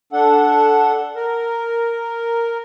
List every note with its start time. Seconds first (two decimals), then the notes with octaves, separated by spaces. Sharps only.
0.13 D4 A4 F#5
1.16 A#4